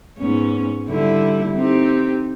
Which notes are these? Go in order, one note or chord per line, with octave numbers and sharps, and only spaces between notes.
G#2 B3 C#4
D3 G3 E4
C4 D#4 G4